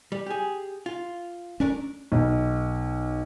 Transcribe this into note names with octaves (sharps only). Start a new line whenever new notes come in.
G3
G4 G#4
F4
A3 C#4 D4 A#4
B1